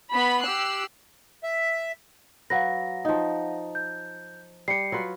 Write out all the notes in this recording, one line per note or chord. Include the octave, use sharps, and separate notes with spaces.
B3 B5 B6
G4 E6 F#6 C7
E5
F#3 B4 F5 F#5 A#6
F3 D#4
G6
G3 G5 C7 C#7
F#3 F4 B4